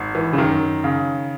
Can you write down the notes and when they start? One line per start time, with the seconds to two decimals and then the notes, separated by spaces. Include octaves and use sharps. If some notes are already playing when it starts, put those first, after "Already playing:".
Already playing: G#1
0.15 E3
0.33 C#3
0.38 F#2 D#3
0.84 C#3